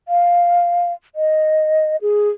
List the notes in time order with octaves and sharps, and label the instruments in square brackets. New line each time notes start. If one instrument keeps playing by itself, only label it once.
[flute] F5
D#5
G#4